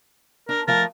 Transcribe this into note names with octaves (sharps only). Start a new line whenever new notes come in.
D4 A#4
F3 A3 F4 A#4 A6